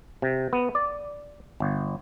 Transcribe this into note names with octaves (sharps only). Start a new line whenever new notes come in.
C3
B3
D5
G1